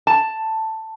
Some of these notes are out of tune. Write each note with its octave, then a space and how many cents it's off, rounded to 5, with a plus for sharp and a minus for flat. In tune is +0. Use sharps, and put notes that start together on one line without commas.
A5 +5